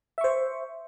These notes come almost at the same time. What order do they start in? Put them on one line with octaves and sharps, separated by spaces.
E5 C#6 C5